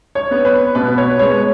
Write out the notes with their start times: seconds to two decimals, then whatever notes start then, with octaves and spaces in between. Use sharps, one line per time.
0.15 C#5
0.31 B3
0.45 B4
0.75 B2 B4
0.98 C#5
1.19 G#3 B3 C#5